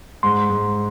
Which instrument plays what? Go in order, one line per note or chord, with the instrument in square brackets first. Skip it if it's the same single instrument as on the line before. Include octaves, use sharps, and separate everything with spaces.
[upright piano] G#2 [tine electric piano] C6
[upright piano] G#2